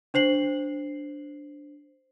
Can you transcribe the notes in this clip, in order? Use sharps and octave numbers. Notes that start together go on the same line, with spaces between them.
D4 C5 C7 F#7